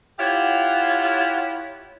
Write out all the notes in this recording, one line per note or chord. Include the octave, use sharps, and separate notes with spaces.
E4 F4 G4 C#5 F#5